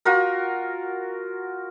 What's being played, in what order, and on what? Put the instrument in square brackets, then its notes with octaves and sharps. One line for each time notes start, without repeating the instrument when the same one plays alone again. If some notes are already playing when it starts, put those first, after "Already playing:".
[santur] F4 F#4 A#4